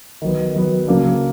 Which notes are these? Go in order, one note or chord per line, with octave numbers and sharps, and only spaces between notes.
D#3 F#3 B3
D#3 F#3 B3
C#3 F#3 A#3 D4